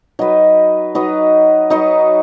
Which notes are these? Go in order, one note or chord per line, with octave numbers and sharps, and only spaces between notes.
F#3 D#4 B4 D#5
F#3 D#4 B4 D#5
F#3 D#4 B4 D#5